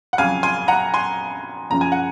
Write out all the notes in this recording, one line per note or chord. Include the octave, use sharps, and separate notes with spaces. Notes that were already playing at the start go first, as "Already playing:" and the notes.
F#5
F2 C#3 F#3 F5 G#5
G#5 C6
F#5 A#5
G#5 C6
F#1 F#2 C#3 F3 A#5
G#5
F#5